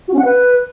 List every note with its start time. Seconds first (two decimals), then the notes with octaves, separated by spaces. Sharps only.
0.08 F#4
0.13 C#4
0.19 F#5
0.25 B4